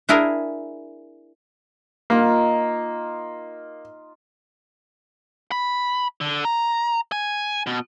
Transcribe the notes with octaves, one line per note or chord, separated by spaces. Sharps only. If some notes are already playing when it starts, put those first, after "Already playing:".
D4 E4 G#4 A#4
A#3 D#4 F4 D#5
B5
D3
A#5
G#5
B2